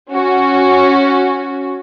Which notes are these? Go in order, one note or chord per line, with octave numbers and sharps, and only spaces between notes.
C#4 F#4